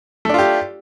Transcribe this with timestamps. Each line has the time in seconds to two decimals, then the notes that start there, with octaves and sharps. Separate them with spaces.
0.25 A3
0.29 D4
0.34 F4
0.38 G4